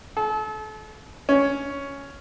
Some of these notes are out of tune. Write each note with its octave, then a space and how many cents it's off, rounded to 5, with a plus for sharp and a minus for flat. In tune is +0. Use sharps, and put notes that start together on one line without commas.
A4 -35
C#4 +5